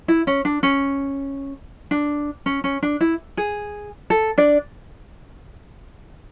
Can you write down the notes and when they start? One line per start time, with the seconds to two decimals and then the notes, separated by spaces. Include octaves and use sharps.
0.08 E4
0.27 C#4
0.45 D4
0.63 C#4
1.91 D4
2.46 C#4
2.64 C#4
2.83 D4
3.01 E4
3.37 G#4
4.10 A4
4.38 D4 D5